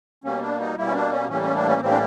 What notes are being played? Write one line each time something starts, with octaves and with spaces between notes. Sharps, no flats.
B2 G3 A#3 C#4
D4
D#4
B2 G3 A#3 E4
C#4
D4
C#4
A2 E3 G3 A#3 C#4
C#4
D4
C#4
A2 E3 G3 A#3 C4
D4